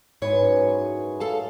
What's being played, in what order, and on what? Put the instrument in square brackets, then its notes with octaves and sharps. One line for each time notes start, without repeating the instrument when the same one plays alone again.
[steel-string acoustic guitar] G#2 C#5 [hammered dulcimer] E4 G#4 B4
[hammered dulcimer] F#2 G#4
[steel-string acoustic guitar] A4 F5 A5